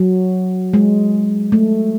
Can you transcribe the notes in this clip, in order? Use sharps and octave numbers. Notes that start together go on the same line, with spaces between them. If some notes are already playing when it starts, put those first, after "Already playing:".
Already playing: F#3
G#3
A3